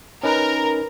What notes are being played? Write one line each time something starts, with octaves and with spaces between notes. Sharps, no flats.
C#4 D#4 A#4 B4